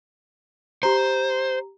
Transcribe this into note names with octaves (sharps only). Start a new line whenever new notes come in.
G4 C5 A#5